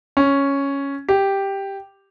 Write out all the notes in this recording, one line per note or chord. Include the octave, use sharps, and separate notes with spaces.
C#4
G4